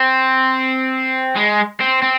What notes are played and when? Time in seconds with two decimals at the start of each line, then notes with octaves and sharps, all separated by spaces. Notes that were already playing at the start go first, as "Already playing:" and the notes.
Already playing: C4
1.36 G#3
1.81 C4
2.02 C4